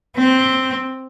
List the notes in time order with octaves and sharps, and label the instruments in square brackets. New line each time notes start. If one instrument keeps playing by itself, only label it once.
[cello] C4